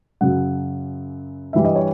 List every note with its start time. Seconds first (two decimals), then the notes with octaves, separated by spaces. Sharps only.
0.21 F#2 C#3 F#3 F#5
1.53 G2 E3 G3 E5
1.65 D#5
1.75 C#5